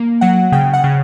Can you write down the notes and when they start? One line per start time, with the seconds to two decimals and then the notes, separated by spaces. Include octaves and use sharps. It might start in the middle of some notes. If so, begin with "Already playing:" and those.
Already playing: A#3
0.21 F#3 F#5
0.52 C#3 G5
0.73 F#5
0.84 C#3